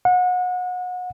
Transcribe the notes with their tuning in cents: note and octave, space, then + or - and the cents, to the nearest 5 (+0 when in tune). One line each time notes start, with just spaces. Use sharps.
F#5 -30